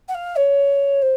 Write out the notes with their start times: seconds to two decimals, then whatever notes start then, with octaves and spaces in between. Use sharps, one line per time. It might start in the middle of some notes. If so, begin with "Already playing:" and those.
0.08 F#5
0.14 F5
0.36 C#5
1.02 C5